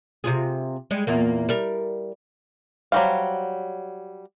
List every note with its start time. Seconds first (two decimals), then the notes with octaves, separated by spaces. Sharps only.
0.24 C3 F4 G#4
0.91 G3 G#3
1.07 E2 A#2 A#3
1.49 G3 A#4
2.92 F#3 G3 F#4 C5 F5